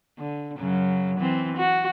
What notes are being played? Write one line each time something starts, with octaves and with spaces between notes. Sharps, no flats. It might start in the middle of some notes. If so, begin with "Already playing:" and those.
D3
F#2 C#3 F#3
E3 C4
F#4